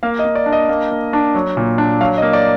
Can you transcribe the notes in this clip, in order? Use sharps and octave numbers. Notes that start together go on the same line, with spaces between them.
A#3 F5
D#5
A#3
D5
D4
D#5
A#3
A#3
D4
F#3
A#2
D4
F#3 F5
D#5
A#3
D5